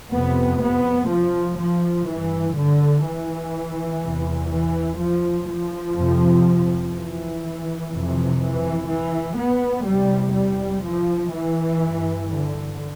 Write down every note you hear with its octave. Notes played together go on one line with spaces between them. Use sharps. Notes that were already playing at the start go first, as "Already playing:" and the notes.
F2 C3 B3
B3
F3
F3
G2 E3
D3
E3
E2 C3
E3
F3
F3
F2 C3
E3
F2 C3
E3
E3
B3
E2 C3 G3
G3
F3
E3
G2
D3